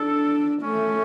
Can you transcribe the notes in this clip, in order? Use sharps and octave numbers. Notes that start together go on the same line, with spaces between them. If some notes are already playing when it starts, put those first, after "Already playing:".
Already playing: D4 A4
A3 C#4